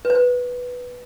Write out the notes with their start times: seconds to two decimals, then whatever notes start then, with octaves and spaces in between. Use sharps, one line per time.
0.05 B4
0.10 C5
0.15 B4